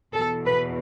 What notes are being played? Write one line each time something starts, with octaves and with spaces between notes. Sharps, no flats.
E2 B2 A4
B4